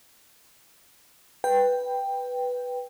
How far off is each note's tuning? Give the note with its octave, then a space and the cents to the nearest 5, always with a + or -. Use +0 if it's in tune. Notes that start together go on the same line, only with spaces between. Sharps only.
B4 +0 G5 +5